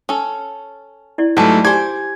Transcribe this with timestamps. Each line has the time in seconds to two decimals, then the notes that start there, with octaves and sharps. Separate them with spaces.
0.09 C#4 A4
1.18 E4 D5
1.37 G#2 E3 F#3 G3 A3 A5
1.65 G4 C5 D5 G#5 G#6